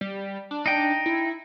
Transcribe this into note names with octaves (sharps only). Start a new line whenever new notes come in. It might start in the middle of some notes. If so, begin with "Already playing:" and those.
G3
D4
D#4 G5
E4